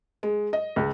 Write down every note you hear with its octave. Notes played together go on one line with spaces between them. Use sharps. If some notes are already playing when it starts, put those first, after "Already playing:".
G#3
D#5
C#2